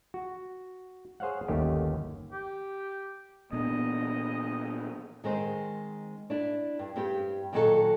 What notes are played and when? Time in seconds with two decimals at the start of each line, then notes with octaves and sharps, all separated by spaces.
0.14 F#4
1.20 G#4 C5 C#5 F5 F#5
1.48 G1 D#2 D#3 A3 C#4 G4
2.32 G4
3.52 A#2 B3 D4 D#5
5.24 D#3 G#3 C4 C5
6.30 D4 E4
6.79 G2
6.96 G2 C4 G4
7.52 A#2 D#3 F#3 F4 F#4 A4